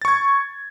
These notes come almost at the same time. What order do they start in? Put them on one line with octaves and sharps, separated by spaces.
A6 C#6 G#6